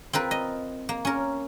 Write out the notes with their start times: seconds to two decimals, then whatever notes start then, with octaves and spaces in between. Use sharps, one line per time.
0.13 C4 F4 A#4 B4
0.31 D#5
0.89 A#3
1.05 C#4 A#4